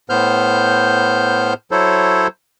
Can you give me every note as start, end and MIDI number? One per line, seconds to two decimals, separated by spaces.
0.10 1.53 45
0.10 1.53 59
0.10 1.53 72
0.10 1.53 89
0.10 1.53 91
1.71 2.27 54
1.71 2.27 64
1.71 2.27 69
1.71 2.27 72
1.71 2.27 73